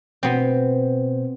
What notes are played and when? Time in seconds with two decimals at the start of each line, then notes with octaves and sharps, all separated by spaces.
0.23 B2 B3 C4 C5